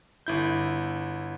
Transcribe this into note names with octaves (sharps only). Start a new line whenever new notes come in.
G1 E4 G6